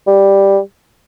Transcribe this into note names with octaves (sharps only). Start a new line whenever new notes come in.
G3